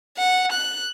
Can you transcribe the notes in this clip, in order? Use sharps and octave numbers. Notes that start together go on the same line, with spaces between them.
F#5
F#6